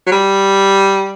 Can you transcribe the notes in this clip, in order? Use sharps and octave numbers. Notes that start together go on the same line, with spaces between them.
F#3
G3